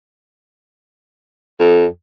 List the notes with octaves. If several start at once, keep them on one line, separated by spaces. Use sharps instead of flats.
F2